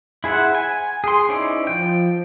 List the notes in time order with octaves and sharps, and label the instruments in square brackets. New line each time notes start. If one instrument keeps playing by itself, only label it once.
[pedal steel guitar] E4 G#4 C5 E5 F#5
G#5
G#4 C6
C#4 D#4 E4 C5 D5
F3 G5